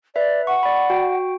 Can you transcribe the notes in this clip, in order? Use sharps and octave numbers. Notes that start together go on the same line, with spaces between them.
B4 D5 E5
F#5 C#6
D5 B5
F#4 G5